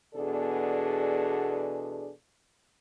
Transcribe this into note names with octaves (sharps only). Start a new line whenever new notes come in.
E2 B2 D4 G#4 A4 D5